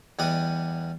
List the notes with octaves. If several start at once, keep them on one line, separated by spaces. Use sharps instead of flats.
E2 G3 D5 D#5 F#5 D#6